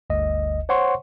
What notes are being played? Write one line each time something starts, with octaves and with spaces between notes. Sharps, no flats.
G1 D2 D#5
C5 C#5 F#5 C6 C#6